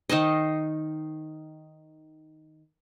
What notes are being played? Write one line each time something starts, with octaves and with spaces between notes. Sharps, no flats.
D#3 D#4 C5 D#5